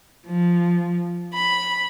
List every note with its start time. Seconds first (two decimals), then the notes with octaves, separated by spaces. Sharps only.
0.27 F3
1.34 B5